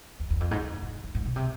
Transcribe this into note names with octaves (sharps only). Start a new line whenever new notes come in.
E2
E2
F2
G#2
G#2
G#2
F2
G#2
B2
C3